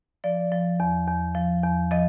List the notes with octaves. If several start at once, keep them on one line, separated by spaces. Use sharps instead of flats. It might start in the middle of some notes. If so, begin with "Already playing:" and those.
F3 D5
F3
E2
E2
F3
E2
F3 D#5